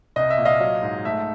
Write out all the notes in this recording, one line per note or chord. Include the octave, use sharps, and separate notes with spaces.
C2 D#5
E5
A#2
D#5 F5
F#3
G#2
A3 E5